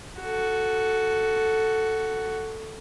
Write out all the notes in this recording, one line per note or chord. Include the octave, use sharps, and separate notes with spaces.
F#4 A4